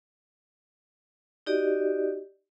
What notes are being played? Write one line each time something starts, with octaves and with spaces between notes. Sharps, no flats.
D#4 F#4 G4 D5 D#5